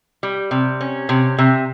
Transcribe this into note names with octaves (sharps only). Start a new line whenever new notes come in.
G3
C3
C#4
C3
C3